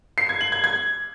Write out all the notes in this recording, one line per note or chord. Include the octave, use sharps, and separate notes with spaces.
C7
G#6
F#7
G#6
G#6